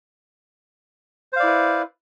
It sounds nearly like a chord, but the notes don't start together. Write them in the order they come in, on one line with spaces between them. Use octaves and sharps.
C5 F5 D5 E4 B4